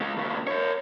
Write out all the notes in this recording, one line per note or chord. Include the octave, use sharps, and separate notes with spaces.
C#3 G#3
D#2 C#3
A#4 C#5